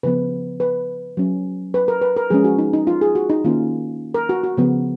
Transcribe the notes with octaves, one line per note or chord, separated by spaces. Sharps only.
C#3 F3 B3 B4
B4
F#3 C#4
B4
A#4
B4
A#4
F3 G#3 C#4 G#4
F#4
D#4
D#4
F4
G#4
F#4
D#4
D#3 A#3 C#4 F4
A#4
F#4
F#4
C#3 F3 B3